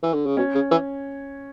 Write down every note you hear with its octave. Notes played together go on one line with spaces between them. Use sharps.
E3
D3
C#3
B2 C#4
C#3
E3